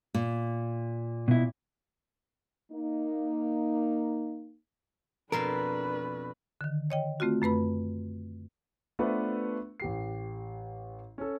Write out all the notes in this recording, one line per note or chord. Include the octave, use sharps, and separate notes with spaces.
A#2
B2 E4
A#3 D#4
F2 B2 D4 A#4 B4 C6
D3 D#3
C#5 D#5 G5
A3 C4 F4 F#4
F#2 A3 B4 B5
A3 B3 D4 F4 B4 C5
A1 G4 C7
C#4 A4